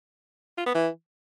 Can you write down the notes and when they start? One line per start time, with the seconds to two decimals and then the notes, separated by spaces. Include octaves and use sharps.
0.58 F4
0.66 B3
0.75 E3